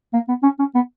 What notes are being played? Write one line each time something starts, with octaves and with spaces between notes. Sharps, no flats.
A#3
B3
C#4
C#4
B3